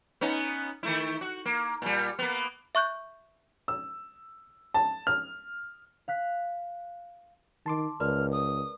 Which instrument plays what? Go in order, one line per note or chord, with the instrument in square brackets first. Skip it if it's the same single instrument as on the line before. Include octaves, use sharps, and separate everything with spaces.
[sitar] B3 C#4 D#4
D#3 A3 E4
F#4
A#3
A#2 G3
A#3 B3
[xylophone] E5 C#6 F#6 G6
[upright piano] E6
A5
F6
[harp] F5 F#6 B6
[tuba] D#3 [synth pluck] A5 C6 D6
[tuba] C#2 [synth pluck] A#4 B4 D5 [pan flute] F6
[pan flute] D#6